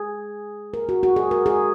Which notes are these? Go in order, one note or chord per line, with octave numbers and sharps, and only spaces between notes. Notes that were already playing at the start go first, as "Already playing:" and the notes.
Already playing: G#4
A#4
F#4
F#4
G#4
A#4
G#4